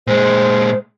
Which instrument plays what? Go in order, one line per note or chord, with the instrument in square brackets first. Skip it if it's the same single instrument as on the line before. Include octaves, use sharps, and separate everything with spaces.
[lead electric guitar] A#2 G#3 [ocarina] C5